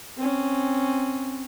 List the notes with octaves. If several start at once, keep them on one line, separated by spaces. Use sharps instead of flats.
C4 C#4